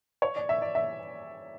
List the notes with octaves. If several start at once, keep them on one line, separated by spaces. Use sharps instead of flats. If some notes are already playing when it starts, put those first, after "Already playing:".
C#5
D5
E5
D5
E5